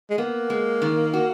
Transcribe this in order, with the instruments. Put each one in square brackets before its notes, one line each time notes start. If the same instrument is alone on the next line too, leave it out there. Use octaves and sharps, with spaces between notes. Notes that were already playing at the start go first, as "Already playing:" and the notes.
[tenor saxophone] G#3
[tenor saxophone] A#3 [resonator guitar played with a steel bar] B3
[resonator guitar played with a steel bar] G#3
D#3
F#4